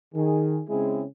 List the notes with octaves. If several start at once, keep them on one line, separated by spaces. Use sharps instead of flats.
D#3 G#4
C#3 G#3 C4 C#4 E4 G#4